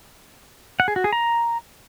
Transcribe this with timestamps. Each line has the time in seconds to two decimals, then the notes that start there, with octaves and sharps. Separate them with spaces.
0.80 F#5
0.88 G#4
0.96 F#4
1.04 G#4
1.13 A#5